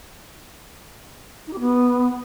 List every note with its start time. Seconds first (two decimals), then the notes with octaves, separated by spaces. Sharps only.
1.47 D#4
1.53 G4
1.59 B3